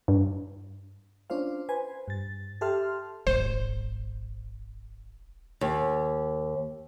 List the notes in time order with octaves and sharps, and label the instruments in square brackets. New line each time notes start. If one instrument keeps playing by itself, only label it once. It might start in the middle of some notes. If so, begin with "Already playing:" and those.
[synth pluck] G2
[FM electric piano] C#4 D4 F4 C5 F5
B4 C5 G#5
G2 A6
G4 A4 E5 A5 C6 F6
[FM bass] D#1 [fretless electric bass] G#1 [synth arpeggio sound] C5
[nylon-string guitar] D#2